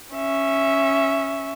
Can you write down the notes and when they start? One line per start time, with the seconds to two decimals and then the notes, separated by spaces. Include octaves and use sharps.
0.15 C#4 E5